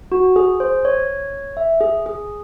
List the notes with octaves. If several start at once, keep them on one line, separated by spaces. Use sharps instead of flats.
F#4
G#4
C5
C#5
E5
G#4
G#4